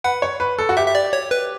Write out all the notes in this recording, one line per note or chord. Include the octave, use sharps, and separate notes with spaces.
B4 F#5
C#5
B4
A4
F#4
G4 E5
E5
D5
C#5
B4